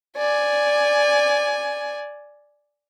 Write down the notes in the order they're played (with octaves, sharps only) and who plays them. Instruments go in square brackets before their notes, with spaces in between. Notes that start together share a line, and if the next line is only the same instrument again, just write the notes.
[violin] D5 G#5